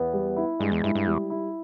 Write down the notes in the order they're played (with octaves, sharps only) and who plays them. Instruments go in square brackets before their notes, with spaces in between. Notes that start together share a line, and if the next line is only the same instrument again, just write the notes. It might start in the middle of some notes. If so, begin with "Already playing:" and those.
Already playing: [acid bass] E2 [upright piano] B3
[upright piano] G3
E4
[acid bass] G2 [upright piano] G#3
[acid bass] E2
[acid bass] G2 [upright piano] E4
[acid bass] G2
[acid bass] E2 [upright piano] G3
[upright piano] E4